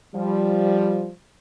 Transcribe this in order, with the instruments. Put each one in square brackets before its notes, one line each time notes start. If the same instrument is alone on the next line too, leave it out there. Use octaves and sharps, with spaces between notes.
[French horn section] F3 G3